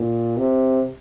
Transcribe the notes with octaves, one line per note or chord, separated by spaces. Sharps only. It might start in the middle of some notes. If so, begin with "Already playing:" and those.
Already playing: A#2
C3